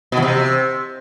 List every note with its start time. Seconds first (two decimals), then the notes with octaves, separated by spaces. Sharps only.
0.12 B2
0.17 E3
0.22 C3